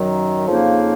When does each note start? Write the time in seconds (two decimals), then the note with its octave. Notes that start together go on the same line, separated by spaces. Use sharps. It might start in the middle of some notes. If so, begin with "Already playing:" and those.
Already playing: F#2 D#3 F#3
0.47 F2 C#3 F3 A#3 D#4